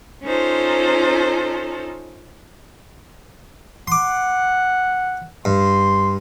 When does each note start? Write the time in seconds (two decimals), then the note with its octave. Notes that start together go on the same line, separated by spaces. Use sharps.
0.23 C#4 D#4 F4 A4 C5
3.88 F#5 C6 D6
5.45 G2 C6